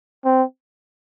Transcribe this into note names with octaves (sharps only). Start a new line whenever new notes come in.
C4